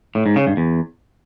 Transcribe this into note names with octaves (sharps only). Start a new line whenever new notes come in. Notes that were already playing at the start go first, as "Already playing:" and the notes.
A2
G#2
C#3
G2
E2